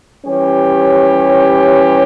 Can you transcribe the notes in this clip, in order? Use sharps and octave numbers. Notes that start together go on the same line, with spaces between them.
E3 G3 C#4 G4 C#5